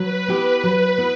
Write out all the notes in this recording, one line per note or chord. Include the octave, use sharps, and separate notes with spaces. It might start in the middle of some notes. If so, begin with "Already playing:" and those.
Already playing: F#3 B4
B3 E4 G4
F#3
B3 E4